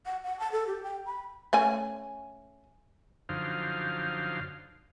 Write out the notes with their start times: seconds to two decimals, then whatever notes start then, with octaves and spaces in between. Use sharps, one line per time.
0.06 F#5
0.24 F#5
0.39 A5
0.52 A4
0.67 G4
0.83 G5
1.06 B5
1.53 A3 C#4 G#5
3.29 F#2 D3 F3 D#4 C5 F5